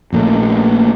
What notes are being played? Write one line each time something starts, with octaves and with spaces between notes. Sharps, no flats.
A#1 A#2 A3 A#3